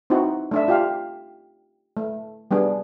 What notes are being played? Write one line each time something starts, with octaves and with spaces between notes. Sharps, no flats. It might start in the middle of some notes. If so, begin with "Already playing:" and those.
C4 D#4 E4 F#4
A3 D4 E5
F4 G4 F5
A3
G3 B3 D4 G#4